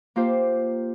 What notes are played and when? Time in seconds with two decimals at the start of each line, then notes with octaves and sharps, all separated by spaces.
0.16 A#3 F4 G4 C5